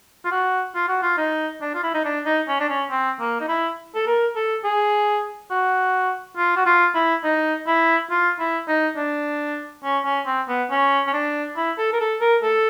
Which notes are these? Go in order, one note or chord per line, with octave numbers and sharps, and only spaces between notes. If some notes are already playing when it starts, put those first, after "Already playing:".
F4
F#4
F4
F#4
F4
D#4
D4
F4
E4
D#4
D4
D#4
C#4
D4
C#4
C4
A#3
D#4
E4
A4
A#4
A4
G#4
F#4
F4
F#4
F4
E4
D#4
E4
F4
E4
D#4
D4
C#4
C#4
C4
B3
C#4
C#4
D4
E4
A4
A#4
A4
A#4
A4